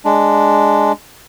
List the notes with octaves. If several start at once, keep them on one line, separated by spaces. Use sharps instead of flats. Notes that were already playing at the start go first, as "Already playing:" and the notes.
G#3 D4